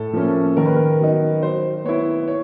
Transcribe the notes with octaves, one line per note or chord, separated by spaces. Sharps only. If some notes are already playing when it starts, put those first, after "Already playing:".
Already playing: A2 A4
F3 A#3 C#4
D#3 A#4
B4
A#4
F#3 B3 D#4
F#3 C5
B3 E4 C#5
C#5